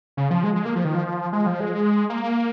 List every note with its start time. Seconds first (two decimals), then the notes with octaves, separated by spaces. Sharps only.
0.17 C#3
0.30 F3
0.44 G#3
0.55 G#3
0.65 A#3
0.76 F3
0.85 D#3
0.94 F3
1.33 G#3
1.46 F3
1.60 G#3
2.10 A#3